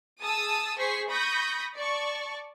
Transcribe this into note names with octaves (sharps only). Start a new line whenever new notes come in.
G#4 A5 D#6 E6
G#4 C5 C#6 B6 C7
B5 C#6 D#6 G6 A#6
D5 A5 C#6